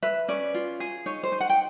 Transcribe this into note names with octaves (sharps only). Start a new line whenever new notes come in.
B4 E5
C#4 D5
F4
G#4
D#4 C#5
C5
D#4
F#5
G5